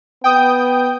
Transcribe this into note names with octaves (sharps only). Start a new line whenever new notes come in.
B3 G5 D#6 G6